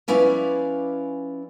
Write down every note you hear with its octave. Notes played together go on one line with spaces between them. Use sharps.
F3 C#4 E4 B4 D5 F5